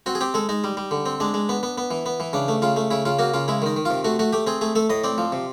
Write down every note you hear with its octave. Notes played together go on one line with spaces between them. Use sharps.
C4 F#4
G#4
C4 G4
G#3 A4
G#3 D#4
G3
G3
D3
C4
G#3 D4
G#3
B3
B3
B3
E3
B3
E3
C#3 D4
A3
C#3 F4
A3
C#3 E4
C#3 F4
A#3 F#4
C#3 F4
G#3 E4
D#3 D#4
D#3
C3 F4
A3 F#4
A3 F#4
A3 G4
C4 G#4
A3 G#4
A3 A4
A2 D#5
C4 D5
F3
C3